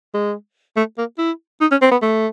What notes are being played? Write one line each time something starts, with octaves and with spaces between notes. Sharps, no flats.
G#3
A3
A#3
E4
D#4
C#4
C4
B3
A3